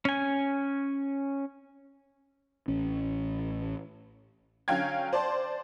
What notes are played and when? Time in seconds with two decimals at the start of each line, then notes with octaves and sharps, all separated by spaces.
0.05 C#4 G#5
2.68 A1 C#4
4.68 D3 F#3 C#4 F5 G5 G#6
5.13 C5 D5 A5 C6